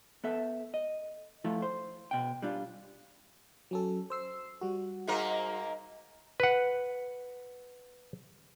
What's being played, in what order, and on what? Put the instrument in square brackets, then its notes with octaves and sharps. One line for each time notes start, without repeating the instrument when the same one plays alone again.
[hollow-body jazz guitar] B3 A4 E5
D#5
F3 A3 E4 F4
C5
B2 G5
G3 D4 F4
[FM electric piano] F#3 C#4 A4
C5 E6 C7
G3 F#4
[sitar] G#2 A#3 A#4
[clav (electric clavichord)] B4 F#5